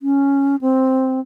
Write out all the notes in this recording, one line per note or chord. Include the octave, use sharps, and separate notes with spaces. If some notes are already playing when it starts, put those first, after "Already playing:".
C#4
C4